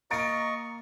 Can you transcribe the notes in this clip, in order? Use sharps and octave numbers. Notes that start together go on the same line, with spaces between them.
A#3 D#5 F5 A#5 C#6 A6 D7